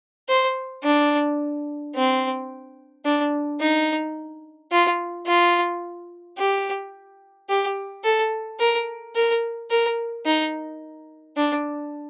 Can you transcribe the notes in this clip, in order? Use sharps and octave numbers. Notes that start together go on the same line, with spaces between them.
C5
D4
C4
D4
D#4
F4
F4
G4
G4
A4
A#4
A#4
A#4
D#4
D4